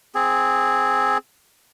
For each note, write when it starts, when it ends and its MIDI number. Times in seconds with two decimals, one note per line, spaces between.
0.15 1.18 60
0.15 1.18 68